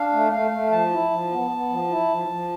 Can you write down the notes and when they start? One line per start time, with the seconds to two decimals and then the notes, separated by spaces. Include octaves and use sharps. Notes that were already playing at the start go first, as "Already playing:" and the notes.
Already playing: D4 F5
0.12 A3
0.32 A3 F5
0.51 A3
0.71 F3 A5
0.91 E4
1.11 F3
1.31 B3
1.51 B3
1.69 F3
1.89 E4
2.08 F3
2.28 F3